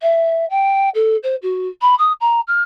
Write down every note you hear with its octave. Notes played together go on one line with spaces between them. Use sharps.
E5
G5
A4
C5
F#4
B5
D#6
A#5
F6